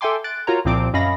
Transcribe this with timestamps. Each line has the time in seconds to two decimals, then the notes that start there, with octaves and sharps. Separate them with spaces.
0.01 A4 E5 G5 G#5 C6 D6
0.24 F#6 A6 D7
0.47 F4 F#4 A#4 C#5 A#5
0.65 C2 A#2 F3 C4 D6 D7
0.94 F#2 C#4 D#5 F5 B5 A#6